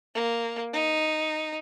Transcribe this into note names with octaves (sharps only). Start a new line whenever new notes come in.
A#3
D#4